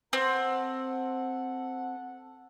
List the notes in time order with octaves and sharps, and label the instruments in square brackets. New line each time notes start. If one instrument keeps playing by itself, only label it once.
[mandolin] C4 [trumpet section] A4 F#5